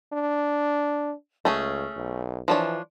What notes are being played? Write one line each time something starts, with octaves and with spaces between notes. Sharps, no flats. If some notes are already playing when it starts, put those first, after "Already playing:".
D4
C#2 A3 C#4 G#4
B1
E3 F3 D4 C#5